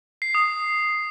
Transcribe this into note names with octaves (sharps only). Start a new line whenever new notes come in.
C7
D#6